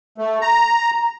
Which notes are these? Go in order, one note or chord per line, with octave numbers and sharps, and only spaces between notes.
A3
A#5